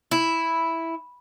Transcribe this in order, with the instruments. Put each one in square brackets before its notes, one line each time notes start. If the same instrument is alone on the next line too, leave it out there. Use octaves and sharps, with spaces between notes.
[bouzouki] E4